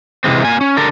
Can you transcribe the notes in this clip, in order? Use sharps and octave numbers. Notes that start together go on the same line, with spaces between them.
C3 E3 G#3 C4
A#3 G#5
C#4
D3 A4 A#4